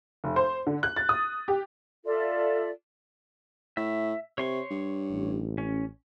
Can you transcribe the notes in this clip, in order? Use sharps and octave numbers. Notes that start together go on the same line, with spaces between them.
F1
C5
D3
F#6
A6
D#6
G4
F4 A4 D5 E5
A2 E5
C3 C#5 C6 C#6
G2
A1
C#4